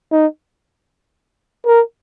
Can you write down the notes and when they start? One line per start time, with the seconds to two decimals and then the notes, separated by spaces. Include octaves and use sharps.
0.11 D#4
1.66 A#4